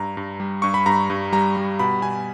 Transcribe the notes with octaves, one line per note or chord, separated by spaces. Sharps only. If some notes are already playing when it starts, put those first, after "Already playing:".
Already playing: G2 A#5
G2
G3
G2 C#6
B5
G2 A#5
G2
G3 A#5
G3
B2 B5
B2 G#5